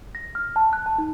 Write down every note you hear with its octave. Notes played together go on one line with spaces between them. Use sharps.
A#6
F6
A5
F#6
A5
D#4